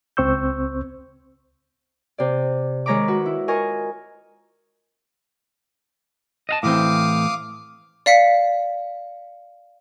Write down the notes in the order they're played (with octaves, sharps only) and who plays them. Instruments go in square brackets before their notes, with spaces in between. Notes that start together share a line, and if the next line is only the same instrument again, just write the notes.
[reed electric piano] C#2 C4 C5 C#6 E6 G6
[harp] C3 D5
D#3 G#3 C#5 A#5 B5 D6
F#4 B4
E4
F4 A#4 D#5 G#5 C#6
[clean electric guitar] D#5 F5 A5
[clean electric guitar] A2 E3 C4 [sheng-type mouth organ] F5 D6 D#6
[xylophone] D5 F5 B6 C#7